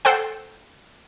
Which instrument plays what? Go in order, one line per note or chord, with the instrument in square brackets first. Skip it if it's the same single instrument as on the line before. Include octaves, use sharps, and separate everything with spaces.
[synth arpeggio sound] A4 C5 F#5 G5